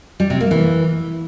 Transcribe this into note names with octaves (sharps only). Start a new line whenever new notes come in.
G3
C3
A#3
E3